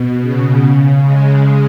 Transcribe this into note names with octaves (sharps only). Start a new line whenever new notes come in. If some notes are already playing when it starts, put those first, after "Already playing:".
Already playing: B2
C#3
C#3
G#3